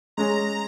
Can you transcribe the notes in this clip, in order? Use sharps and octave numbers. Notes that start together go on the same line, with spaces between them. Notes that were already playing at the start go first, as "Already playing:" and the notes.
G#3 C#4 G#4 A#5